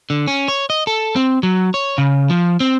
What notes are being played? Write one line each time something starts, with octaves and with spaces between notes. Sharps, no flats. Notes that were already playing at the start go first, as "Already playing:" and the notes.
D3
C#4
C#5
D#5
A4
C4
F#3
C#5
C#3
F3
C4